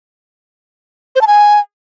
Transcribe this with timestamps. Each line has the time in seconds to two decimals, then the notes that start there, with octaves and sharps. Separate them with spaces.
1.16 C5
1.21 A5
1.27 G#5